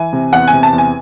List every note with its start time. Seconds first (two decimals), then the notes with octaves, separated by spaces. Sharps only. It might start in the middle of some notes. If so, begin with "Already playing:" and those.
Already playing: E3 G#5
0.13 C3
0.33 E2 F#5
0.48 G#5
0.53 C3
0.63 A5
0.73 E2
0.78 G#5